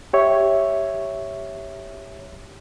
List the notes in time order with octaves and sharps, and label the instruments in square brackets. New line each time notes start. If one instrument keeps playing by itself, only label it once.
[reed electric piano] G4 C#5 E5